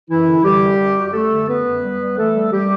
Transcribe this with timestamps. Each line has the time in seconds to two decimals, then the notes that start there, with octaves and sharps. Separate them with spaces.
0.09 F#2 E3 E4
0.26 D3
0.44 D3 G3 G4
0.62 F#2
0.79 F#2
0.96 F#2 F#4
1.06 G4
1.13 D3 A3 A4
1.30 D3
1.47 F#2 B3 B4
1.65 F#2
1.83 G3
2.00 G3
2.17 E3 A3 A4
2.34 G3
2.51 F#2 G3 G4